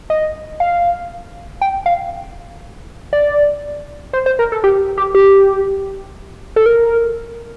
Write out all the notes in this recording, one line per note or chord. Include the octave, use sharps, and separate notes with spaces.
D#5
F5
G5
F5
D5
C5
C5
A#4
A4
G4
G4
G4
A4
A#4